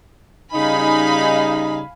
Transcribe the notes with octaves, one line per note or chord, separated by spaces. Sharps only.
C#3 G3 D#4 F5 G#5 B5